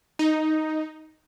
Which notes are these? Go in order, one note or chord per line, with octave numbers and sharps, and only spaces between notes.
D#4